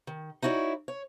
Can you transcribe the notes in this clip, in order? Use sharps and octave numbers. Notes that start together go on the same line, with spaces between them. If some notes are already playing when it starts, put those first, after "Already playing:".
D#3
D#4 E4 F#4 C#5 D5
C#5